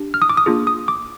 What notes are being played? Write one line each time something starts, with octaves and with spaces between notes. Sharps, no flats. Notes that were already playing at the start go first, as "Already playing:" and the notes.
Already playing: D4 G4
F6
D#6
D6
D#6
A#3 D4 F4 G#4
D#6
D6